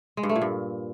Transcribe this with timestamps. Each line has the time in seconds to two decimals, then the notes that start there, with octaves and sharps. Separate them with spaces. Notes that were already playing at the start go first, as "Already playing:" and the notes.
0.17 G#3
0.23 G2
0.29 A3
0.36 A#2
0.42 G2